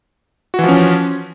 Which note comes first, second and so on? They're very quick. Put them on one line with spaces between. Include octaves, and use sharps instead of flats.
F#4 E3 F3 C#4